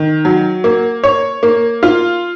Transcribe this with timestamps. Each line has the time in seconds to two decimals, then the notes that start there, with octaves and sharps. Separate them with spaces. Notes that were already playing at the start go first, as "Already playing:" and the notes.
Already playing: D#3
0.25 F#3
0.64 A#3
1.04 C#5
1.43 A#3
1.83 F4